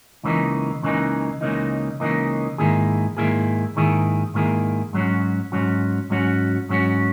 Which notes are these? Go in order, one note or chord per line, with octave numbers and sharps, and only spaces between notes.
C#2 C#3 E3 A#3 D#4
C#2 C#3 E3 A#3 D#4
C#2 C#3 E3 A#3 D#4
C#2 C#3 E3 A#3 D#4
G#2 D#3 A#3 E4 G#4
G#2 D#3 A#3 E4 G#4
G#2 D#3 A#3 E4 G#4
G#2 D#3 A#3 E4 G#4
G#2 F#3 C#4 F#4
G#2 F#3 C#4 F#4
G#2 F#3 C#4 F#4
G#2 F#3 C#4 F#4